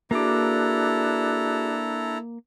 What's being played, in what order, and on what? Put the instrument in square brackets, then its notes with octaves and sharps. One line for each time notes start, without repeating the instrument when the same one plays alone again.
[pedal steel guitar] A#3 D6 [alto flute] D4 [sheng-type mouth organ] E4 A4 A#5 [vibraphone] F#4 G#4